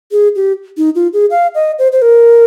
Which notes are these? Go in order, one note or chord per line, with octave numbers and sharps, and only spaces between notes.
G#4
G4
D#4
F4
G#4
F5
D#5
C5
C5
A#4